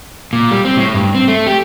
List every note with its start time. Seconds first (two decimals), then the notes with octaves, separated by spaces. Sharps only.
0.33 A#2
0.51 G3
0.65 C4
0.77 A2
0.94 G2
1.15 C4
1.28 A3
1.47 G4